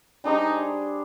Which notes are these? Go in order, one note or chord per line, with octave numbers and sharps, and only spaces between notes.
G3 D4 D#4 G#4 C5